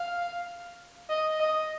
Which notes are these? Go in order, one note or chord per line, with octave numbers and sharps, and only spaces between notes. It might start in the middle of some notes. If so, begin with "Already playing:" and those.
Already playing: F5
D#5
D#5